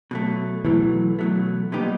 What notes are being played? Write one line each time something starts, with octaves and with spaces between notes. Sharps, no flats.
B2 F#3 A3
B2 E3 F#3 A3
B2 F#3 A3
A#2 G3 B3 D#4 G4